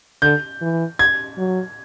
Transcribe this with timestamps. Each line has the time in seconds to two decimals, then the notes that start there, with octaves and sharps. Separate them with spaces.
0.22 D3 G6
0.61 E3
0.99 G#6
1.38 F#3